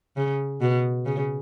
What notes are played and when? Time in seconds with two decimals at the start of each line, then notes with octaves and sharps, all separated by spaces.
0.17 C#3
0.61 B2
1.06 C#3